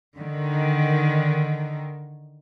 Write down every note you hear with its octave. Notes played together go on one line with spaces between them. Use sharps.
D3 D#3